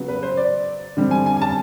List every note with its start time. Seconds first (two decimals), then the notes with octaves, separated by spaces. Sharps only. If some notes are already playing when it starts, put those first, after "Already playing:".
Already playing: C#3 F#3 B3
0.08 B4
0.23 C5
0.37 D5
0.97 D3 G3 C4
1.11 G#5
1.26 G#5
1.37 G#5
1.42 A5